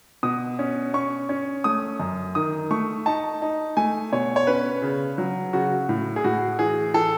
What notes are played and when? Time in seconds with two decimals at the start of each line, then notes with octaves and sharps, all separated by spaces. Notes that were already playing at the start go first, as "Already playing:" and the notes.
0.23 B2 D#6
0.59 C#4
0.94 C#4 C#6
1.29 C#4
1.64 A3 D#6
2.00 F#2
2.35 D#3 D#6
2.71 A3 C#6
3.06 D#4 A5
3.42 D#4
3.77 A3 G#5
4.12 B2 C#5
4.36 C#5
4.47 C#4 B4
4.82 C#3
5.18 F#3
5.53 C#3 F#4
5.89 A2
6.16 G#4
6.24 A2 F#4
6.59 E3 G#4
6.94 E3 A4